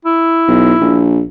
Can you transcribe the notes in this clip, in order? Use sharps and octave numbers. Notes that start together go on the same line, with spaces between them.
E4
B1
A#1